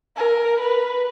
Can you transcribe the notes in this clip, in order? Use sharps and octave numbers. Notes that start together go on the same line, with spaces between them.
A#4
B4